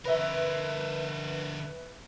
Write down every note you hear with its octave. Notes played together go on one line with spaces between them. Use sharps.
D3 A#4 B4 E5